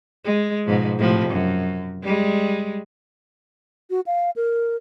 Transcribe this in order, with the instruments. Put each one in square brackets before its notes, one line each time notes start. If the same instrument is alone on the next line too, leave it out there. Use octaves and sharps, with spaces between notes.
[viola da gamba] G#3
G#2 B2 F3
A2 C3 F3
F#2
G3 G#3
[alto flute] F#4
F5
A#4